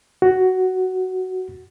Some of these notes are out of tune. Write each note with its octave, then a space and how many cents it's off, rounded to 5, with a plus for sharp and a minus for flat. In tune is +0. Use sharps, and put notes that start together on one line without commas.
F#4 +10